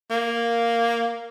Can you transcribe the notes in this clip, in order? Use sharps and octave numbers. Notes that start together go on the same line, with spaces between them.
A#3